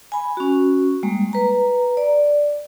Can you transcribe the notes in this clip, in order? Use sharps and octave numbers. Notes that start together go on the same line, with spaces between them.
G#5 B5
C#4 F#4
G3 G#3 A#3
B4 A#5
D5